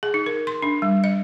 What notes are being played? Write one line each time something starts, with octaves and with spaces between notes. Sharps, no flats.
G#4
D#4
A#4
C6
D4
G3
D#5